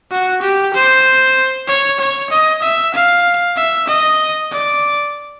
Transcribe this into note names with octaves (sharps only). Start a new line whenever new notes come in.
F#4
G4
C5
C#5
C#5
D#5
E5
F5
E5
D#5
D5